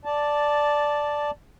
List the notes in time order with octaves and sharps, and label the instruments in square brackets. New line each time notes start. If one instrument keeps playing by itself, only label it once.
[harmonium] D5 A5